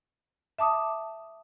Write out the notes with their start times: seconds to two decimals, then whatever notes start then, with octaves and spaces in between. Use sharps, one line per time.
0.59 E5 A5 D6 D#6